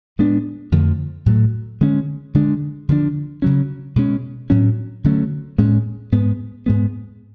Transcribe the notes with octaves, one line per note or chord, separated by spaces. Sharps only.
A2 G#3 B3 D4
F2 D3 F3 A3
A2 F#3 A3
D3 G#3 C#4
D3 G#3 D4
D3 F3 G#3 D4
C#3 F#3 C#4
B2 G#3 C#4
A2 F#3 C#4
D3 F#3 A3 C#4
A2 G#3 C#4
G#2 G#3 B3
G#2 G#3 B3